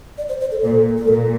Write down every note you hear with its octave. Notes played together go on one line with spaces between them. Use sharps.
D5
C5
C5
A4
A#2 A4
A4
A#2 A#4